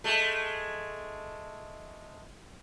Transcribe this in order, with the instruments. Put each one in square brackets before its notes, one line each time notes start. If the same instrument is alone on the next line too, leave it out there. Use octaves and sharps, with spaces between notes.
[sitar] G#3 A3